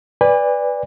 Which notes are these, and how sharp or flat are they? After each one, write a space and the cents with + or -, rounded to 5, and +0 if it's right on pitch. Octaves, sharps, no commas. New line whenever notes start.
B4 +0 D5 +0 G#5 -40